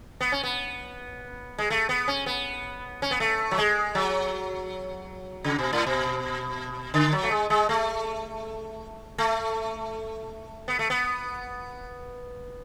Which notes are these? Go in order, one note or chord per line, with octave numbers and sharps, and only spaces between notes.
B3
C#4
B3
G#3
A3
B3
C#4
B3
C#4
B3
A3
F#3
G#3
F#3
C#3
B2
A2
B2
D3
F#3
A3
G#3
G#3
A3
A3
B3
A3
B3